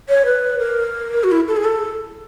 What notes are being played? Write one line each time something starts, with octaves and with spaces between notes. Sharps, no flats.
C#5
B4
A#4
F#4
E4
A4
G#4
A4